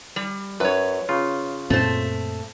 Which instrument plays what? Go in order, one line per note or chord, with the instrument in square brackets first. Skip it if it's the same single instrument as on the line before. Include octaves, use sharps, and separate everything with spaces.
[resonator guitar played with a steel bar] G3
[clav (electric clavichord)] F#2 [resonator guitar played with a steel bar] B4 C#5
[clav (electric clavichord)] C#3 F4
[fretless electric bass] F#2 A#2 C4 [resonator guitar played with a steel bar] A3 C5